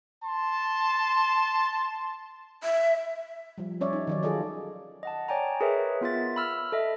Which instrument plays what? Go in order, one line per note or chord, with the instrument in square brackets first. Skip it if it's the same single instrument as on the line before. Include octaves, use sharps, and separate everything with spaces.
[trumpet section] A5 C6
[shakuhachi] E5
[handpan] F3 G3
G3 C#4 C#5 D5 E5
D#4
D#3 F#3 D5
F4 G#4 A4 D5 D#5
[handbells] D#5 F#5 A5
C#5 D5 G5 G#5 A#5
G#4 A#4 B4 C#5 D#5 E5
B3 F4 E5 A6
B5 E6 F6
A4 D#5 E5